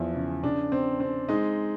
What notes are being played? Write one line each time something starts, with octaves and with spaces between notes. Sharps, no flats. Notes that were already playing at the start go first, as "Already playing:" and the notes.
Already playing: E2 F3 E4
C#3
C#3 D4
C4
C4
G#3 D#4